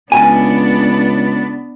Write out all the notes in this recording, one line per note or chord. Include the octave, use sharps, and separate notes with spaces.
C#2 B3 D4 G#5